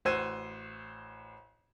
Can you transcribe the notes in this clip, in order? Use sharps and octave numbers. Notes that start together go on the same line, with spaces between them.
A1 F#4 C5 E6 G#6 D#7